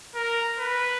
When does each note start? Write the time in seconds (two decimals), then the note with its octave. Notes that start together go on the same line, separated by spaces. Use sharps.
0.15 A#4
0.58 B4